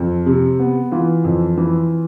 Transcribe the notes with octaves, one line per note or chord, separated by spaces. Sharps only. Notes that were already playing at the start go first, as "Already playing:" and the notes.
Already playing: F2
C3
B3
E3 F4
F2
E3